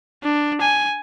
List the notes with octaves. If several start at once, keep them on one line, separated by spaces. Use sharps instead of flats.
D4
G#5